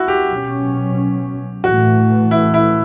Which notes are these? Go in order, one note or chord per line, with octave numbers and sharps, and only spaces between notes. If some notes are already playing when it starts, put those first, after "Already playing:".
Already playing: E4 F#4
G4
B2 F#3 C#4
A2 E3 A3 F#4
E4
E4